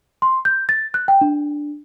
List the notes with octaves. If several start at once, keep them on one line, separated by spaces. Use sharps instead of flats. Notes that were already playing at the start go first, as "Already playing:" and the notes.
C6
G6
A6
F#6
G5
D4